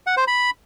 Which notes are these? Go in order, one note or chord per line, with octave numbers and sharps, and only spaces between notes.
F#5
C5
B5